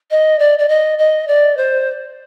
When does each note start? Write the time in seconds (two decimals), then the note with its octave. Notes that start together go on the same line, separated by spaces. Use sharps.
0.10 D#5
0.39 D5
0.58 D5
0.68 D#5
0.98 D#5
1.27 D5
1.57 C5